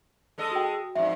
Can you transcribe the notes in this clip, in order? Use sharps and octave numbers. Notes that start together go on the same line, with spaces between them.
G#3 A4 D#5
F#4 G5
F2 G#2 E5